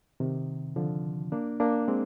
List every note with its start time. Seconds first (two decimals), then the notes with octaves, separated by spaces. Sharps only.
0.20 C3 D#3
0.76 D3 F3
1.32 A#3 D4
1.60 A#3 D4
1.88 G#3 C4